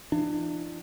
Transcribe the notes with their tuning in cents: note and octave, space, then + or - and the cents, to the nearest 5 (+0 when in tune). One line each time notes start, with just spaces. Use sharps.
E3 +45 D4 +35